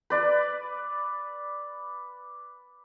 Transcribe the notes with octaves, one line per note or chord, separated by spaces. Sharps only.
B4 D5